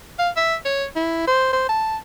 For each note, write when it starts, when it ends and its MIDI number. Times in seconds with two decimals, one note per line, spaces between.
0.19 0.30 77
0.37 0.55 76
0.65 0.85 73
0.96 1.26 64
1.28 1.51 72
1.53 1.64 72
1.69 1.97 81